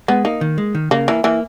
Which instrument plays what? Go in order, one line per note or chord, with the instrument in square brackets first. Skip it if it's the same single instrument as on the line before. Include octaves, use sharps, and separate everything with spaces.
[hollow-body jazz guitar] G#3 [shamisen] B3
[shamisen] A#3 [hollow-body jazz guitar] D#4
[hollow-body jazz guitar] D#3
G#3
D#3
[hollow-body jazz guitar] C#3 [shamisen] A#3
[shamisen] E3 [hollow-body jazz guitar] A#3
[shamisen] E3 [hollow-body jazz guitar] A#3